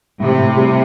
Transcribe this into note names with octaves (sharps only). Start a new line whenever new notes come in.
A2 C3
A2
G3